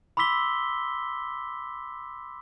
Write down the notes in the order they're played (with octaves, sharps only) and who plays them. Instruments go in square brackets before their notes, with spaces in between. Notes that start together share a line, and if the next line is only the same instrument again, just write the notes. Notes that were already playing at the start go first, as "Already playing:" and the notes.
[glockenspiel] B5 C6 D6 E6 B6 G7